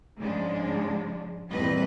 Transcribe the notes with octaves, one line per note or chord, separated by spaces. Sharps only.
G#2 C#3 F3 G#3 D4
E2 A#2 G3 C4 B4 D#5